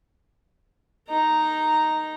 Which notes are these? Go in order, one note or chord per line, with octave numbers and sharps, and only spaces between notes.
D#4 A#5